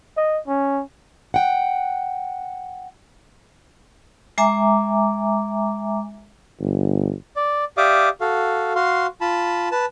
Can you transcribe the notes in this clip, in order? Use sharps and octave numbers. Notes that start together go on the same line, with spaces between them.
D#5
C#4
F#5 G5
G#3 E5 G#5 A#5 D6
G1
D5
G4 D5 E5 F5 D6 D#6
F#4 A4 F5
F#4 F5 C6
F4 A5 B5
B4 A5